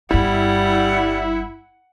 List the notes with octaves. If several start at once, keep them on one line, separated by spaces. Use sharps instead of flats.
G1 G2 G3 E4 F#5